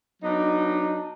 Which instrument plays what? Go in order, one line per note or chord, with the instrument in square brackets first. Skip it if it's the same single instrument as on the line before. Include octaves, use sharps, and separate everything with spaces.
[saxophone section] F#3 B3 D4 D#4